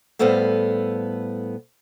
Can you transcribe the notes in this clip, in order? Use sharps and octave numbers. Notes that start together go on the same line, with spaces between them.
A2 G3 B3 A4 C5 F5